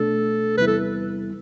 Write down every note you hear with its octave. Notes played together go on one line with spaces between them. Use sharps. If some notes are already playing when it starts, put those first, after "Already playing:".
Already playing: C2 B2 A3 D4 A4
E2 C3 G3 B3 E4 B4
A4